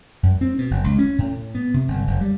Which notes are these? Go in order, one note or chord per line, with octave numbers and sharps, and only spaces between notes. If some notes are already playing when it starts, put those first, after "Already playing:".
F#2
C4
B2
F#1
C#2
C#4
A2
B3
C3
G1
F#1
G3